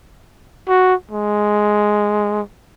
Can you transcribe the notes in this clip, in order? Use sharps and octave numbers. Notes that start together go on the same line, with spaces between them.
F#4
G#3